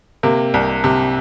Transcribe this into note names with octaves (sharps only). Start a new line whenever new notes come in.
C3 A#3
C2
C3